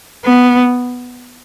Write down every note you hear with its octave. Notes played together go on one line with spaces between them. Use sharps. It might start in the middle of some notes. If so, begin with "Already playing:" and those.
B3